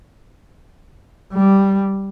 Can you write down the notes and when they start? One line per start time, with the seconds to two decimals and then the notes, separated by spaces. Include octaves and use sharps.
1.33 G3